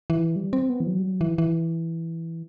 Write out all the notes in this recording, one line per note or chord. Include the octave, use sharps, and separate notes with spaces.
E3
G3
C4
B3
E3
F#3
G3
F#3
E3
E3